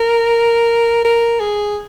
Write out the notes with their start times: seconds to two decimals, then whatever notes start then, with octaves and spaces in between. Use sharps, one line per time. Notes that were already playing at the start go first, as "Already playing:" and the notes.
Already playing: A#4
1.05 A#4
1.40 G#4